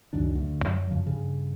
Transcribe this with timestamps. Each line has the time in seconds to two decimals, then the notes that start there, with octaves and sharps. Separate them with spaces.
0.13 C#2 F#2 D#3 D4
0.35 D2
0.62 F#2 F#3
0.90 F#2 C#3 F3
1.07 G2 C#3